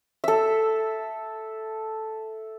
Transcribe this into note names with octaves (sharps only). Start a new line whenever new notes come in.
A4 E5